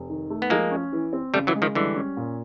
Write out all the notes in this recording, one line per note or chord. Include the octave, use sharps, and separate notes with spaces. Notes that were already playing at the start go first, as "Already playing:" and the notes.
Already playing: F1
D#3
A3
B3
F3 G#3 A#3
C#4
E3
C4
C#3 G3 A3
E3 F#3
G#3
D#3 F3
D3 E3 G3
C#4
A#2